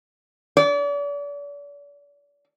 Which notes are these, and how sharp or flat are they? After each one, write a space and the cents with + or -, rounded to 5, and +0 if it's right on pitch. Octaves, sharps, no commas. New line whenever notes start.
D5 -40